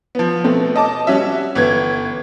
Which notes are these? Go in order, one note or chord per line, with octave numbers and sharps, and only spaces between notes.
F3 B3
B2 A3 B3 C4
D#5 A5 D6
G3 C#4 F#4 E5
G1 E3 G#6